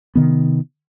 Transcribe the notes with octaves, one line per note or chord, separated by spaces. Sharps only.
C3 D#3 B3